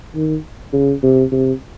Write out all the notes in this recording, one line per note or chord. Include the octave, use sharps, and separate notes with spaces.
D#3
C#3
C3
C3